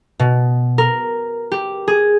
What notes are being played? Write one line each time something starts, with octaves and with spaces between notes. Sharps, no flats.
B2
A#4
G4
G#4